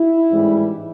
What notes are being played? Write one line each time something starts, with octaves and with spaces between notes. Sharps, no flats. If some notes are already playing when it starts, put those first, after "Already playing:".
Already playing: E4
A1 G#2 E3 G3